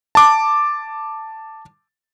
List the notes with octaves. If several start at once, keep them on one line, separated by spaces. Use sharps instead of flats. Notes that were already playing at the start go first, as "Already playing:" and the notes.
A5 D6